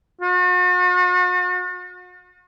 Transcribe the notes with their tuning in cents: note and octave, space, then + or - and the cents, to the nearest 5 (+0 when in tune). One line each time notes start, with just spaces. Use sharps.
F#4 -45